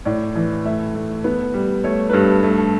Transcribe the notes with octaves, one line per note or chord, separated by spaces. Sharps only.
A2 D5
E3
A3 E5
A3
B3
G3
A3 C#5
B4
G2 A4
A3
A4